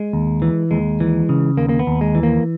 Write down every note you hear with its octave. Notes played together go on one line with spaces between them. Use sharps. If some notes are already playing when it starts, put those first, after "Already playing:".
Already playing: G#3
D#2
E3
D#2 G#3
E3
C#3
D#2 A#3
A#3
B3
D#2
G#3
E3
A#3